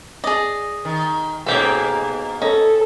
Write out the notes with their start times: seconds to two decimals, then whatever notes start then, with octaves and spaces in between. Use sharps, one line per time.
0.24 G#4 D5 D#5
0.85 D#3
1.46 G#2 B2 A#3 C#4 G4 A4
2.42 C#4 A4 D#5